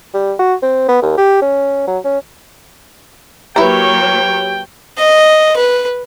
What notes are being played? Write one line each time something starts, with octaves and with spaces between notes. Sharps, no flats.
G3
F#4
C4
B3
D#2
G4
C#4
F#3
C#4
F#3 A#3 E4 G4 B4 C#5 G5 A#5
D#5
B4